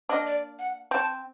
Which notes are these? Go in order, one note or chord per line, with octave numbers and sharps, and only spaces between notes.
A#3 D4 D#5
D5
F#5
C4 A5